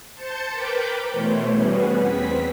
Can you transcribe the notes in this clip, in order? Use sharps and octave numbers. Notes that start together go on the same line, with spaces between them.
C5 A5 G6 A6 C#7
A#4 B4 G5 B5 D6 G6
B2 E3 A3 C5 C#5
G3 B3 C#4 F#4 G#4 B4
E2 C4 B6